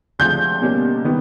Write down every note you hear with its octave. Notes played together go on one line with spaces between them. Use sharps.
D2 C3 F3 G#3 G6
B2 G3 A#3 C#4
C3 D#3 G3 B3